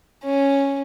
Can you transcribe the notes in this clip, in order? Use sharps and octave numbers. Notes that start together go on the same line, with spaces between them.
C#4